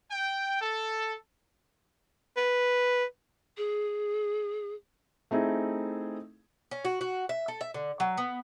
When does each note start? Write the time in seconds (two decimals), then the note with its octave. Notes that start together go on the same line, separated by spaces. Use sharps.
0.11 G5
0.61 A4
2.37 B4
3.57 G#4
5.31 A3 C4 D#4 E4 G#4
6.71 C#4
6.85 F#4
7.01 F#4
7.29 E5
7.48 A4
7.61 E5
7.74 D3
8.00 F#3
8.18 B3